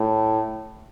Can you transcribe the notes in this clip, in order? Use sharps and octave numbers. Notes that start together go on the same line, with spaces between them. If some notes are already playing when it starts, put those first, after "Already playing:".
Already playing: A2